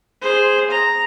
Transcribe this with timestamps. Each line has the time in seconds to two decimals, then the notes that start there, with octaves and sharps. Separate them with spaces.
0.21 G#4 C5
0.71 A#5